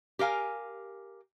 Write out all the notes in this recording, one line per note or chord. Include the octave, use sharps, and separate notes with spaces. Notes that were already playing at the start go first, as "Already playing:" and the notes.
G4 A#4 F5 G#5